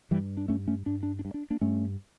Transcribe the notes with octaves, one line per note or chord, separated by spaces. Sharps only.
G2 E3 G3
D4
G2 A3 C#4
A3 C#4
G2 D4
D4
D4
G2
D4
A#3 D4
G2 A3 C#4